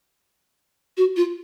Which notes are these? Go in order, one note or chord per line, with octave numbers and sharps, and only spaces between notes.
F#4
F4